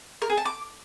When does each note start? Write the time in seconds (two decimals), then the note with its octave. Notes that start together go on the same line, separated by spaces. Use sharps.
0.22 A#4
0.30 G#4
0.37 A5
0.45 D6